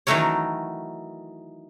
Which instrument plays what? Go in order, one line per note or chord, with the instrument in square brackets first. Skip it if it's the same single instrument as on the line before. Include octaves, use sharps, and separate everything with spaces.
[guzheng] D#3 E3 F#3 A3 A#4 C#5